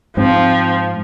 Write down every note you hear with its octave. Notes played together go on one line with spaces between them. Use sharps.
G#2 F3 C4